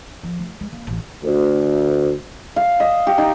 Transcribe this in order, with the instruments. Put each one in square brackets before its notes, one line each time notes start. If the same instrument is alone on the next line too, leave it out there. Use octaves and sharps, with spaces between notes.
[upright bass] F3
A3
G#3
A#3
A1
[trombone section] D2
[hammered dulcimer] F5
D#5
G4
D#4